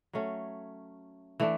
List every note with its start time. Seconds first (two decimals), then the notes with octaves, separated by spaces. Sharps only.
0.13 F#3 A3 C#4
1.40 E3 A3 D4